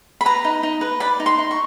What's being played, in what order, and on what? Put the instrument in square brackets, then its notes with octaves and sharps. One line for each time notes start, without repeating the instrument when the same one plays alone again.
[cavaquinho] B5
B4 A#5
D#4
D#4
B4
D5 B5
D#4
C6
D#4
C#6